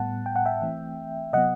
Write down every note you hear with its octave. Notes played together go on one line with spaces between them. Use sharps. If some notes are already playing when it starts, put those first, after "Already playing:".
Already playing: A2 G3 B3 F#5 A5
G5
F#5
E5 G5
E3 A3 C4
C3 F#3 B3 D#5 F#5